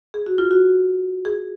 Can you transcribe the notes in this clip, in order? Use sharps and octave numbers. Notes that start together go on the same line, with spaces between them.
G#4
F#4
F4
F#4
G#4